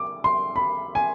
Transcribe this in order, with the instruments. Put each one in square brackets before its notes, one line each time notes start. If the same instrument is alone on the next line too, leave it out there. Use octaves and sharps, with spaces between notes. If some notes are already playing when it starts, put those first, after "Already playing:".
Already playing: [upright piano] D6
C6
B5
G#5